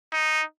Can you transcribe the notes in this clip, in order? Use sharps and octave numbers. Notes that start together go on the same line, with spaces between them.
D#4